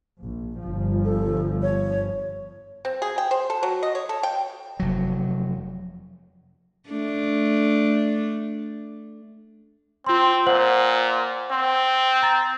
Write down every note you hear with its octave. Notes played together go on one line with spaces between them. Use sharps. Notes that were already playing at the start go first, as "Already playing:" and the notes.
A#1
G1 F3
A4
C#5
C4
G#4
G5
C5
A4
F#3
D#5
C#5
A4
G5
F1 F#3
A3 D4
C4 F4 C6
A#2 C5 F#5 F#7
C4
A#5 A6